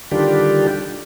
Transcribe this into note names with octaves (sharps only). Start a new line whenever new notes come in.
D3 D#3 G3 D4 F4 G4